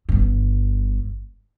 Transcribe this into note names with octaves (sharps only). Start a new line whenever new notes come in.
G1 G2